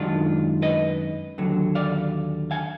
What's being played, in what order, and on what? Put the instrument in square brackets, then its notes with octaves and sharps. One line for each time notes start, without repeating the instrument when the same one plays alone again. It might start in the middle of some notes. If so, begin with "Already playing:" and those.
Already playing: [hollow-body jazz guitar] F#2 D#3 G#3 D4 F4
B4 D#5
D#2 D3 F#3
D5 F5
F5 G#5